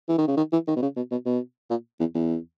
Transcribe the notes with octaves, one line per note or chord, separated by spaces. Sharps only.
E3
D#3
C#3
D#3
E3
D#3
B2
C#3
B2
B2
B2
A#2
E2
E2